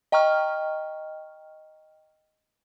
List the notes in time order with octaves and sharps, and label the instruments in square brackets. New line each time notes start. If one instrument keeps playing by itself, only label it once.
[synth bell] D#5 G5 A#5 C#6 F6